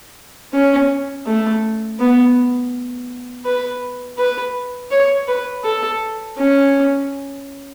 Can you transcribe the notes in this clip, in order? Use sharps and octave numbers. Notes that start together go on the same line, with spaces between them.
C#4
A3
B3
B4
B4
C#5
B4
A4
C#4